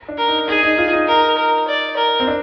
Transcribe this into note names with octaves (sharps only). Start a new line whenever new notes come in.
D4
A#4
D#4
D#4 G#4
D#4
F4
D#4
A#4
A#4
D5
A#4
C4
D4